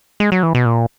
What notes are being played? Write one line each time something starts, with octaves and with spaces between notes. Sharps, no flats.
G#3
F#3
E3
B2
A#2